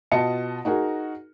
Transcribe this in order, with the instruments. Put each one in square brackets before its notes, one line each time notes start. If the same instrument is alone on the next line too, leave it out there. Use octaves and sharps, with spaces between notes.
[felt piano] B2 F4 D#5 A5 C#7
D#4 F#4 G#4 A#4